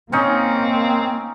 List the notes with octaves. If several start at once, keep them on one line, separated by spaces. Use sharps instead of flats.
A#3 C4 C#4 D#4